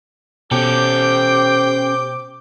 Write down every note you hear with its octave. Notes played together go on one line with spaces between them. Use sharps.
B2 C#4 G4 A4 C5 G5 D6